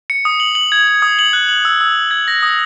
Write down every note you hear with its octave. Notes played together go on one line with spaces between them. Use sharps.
C#7
D#6
F#7
F#7
G#6
G#6
D#6
F#7
F#6
F#7
E6
E6
E6
G#6
A#6
D#6